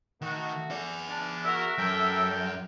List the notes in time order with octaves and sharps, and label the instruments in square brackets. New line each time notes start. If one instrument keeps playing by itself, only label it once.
[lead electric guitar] D#3 [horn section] A3 F#4
[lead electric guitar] G#4 D5
[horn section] D4
[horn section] F#4 A#4 [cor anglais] E5
[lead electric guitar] F#2 [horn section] A4 A#4 G5